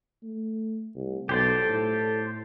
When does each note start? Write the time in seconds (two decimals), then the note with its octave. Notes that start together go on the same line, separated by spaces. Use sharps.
0.23 A3
0.95 C2
1.29 B1 G4 A4 C5 D5
1.69 A2